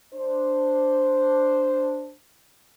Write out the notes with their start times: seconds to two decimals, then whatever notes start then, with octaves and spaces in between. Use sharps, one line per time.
0.14 D4 C5